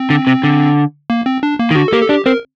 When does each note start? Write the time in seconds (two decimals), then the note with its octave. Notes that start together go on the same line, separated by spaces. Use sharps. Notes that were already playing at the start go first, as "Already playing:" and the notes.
Already playing: C4
0.10 D3
0.27 C3
0.43 D3
1.10 A#3
1.26 C4
1.43 D4
1.59 A#3
1.71 D#3
1.75 D3 F#4
1.88 A4
1.93 A#3 G4
2.02 A4
2.09 D4 G4
2.26 C4 A#4